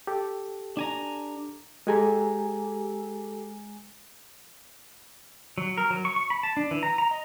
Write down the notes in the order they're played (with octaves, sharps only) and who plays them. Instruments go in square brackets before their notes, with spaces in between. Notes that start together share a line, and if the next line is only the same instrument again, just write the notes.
[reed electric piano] G4 A4
[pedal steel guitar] D4 G#5 A#5
[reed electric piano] G#3 G#5 A#5 [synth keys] G4 A4
[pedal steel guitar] F#3
A#4
F#3
C#6
C#6
B5
A5
D4
E3
A#5
A#5
D#5